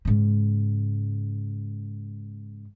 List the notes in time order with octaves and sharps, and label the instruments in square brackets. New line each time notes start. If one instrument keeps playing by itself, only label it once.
[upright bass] G#2 C#3